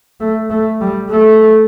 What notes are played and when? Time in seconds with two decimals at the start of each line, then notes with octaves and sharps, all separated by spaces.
0.20 A3
0.50 A3
0.80 G3
1.10 A3